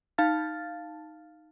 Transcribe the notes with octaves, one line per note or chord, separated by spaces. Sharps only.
D#4 F5 A5 F6 A6